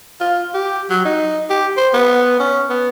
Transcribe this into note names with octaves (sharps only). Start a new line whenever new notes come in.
F4
G4
F#3
D#4
G4
C5
B3
C#4
B3